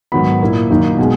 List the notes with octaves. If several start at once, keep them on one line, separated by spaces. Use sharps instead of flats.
G#2 D#3 F#3 B3 B5
A#2 A#3 E4
F#2 D#3 A#3 D#4
B2 G#3